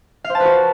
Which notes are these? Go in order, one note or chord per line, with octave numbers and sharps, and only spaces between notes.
F5
C5
A5
B4
F#4